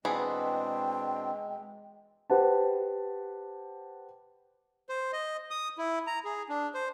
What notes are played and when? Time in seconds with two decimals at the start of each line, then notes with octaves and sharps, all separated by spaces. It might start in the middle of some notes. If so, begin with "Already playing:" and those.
0.05 B2 E3 G#3 B3 C4 D4 G#4 G5
2.30 G4 B4 C5 F#5 A5
4.89 C5
5.13 D#5
5.51 D#6
5.78 E4
6.07 A#5
6.24 G#4
6.49 D4
6.74 C5